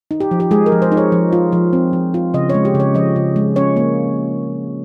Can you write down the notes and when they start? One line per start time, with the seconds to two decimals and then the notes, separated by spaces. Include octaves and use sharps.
0.11 D#4
0.20 G4
0.31 F3
0.40 G4
0.51 G#3 G#4
0.66 A#4
0.72 F3
0.82 C5
0.92 D#4
0.97 C#5
1.12 F3
1.33 F4
1.52 F3
1.73 C4
1.93 F3
2.14 F4
2.34 C#3 D#5
2.49 G#3 C#5
2.65 G4
2.75 C#3
2.80 C#5
2.94 F3 D#5
3.16 C#3
3.36 G#3
3.56 C#4 C#5
3.76 A#3